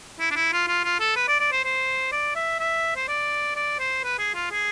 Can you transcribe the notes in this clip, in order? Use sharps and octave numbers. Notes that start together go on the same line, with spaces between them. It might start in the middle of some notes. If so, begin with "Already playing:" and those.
E4
D4
E4
F4
F4
F4
A4
B4
D5
D5
C5
C5
D5
E5
E5
C5
D5
D5
C5
B4
G#4
F4
G#4